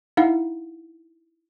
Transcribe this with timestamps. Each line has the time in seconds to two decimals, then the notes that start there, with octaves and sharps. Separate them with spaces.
0.17 D#4 E4 F5 F#5